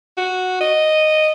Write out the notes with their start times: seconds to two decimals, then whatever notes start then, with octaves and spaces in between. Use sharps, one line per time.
0.17 F#4
0.61 D#5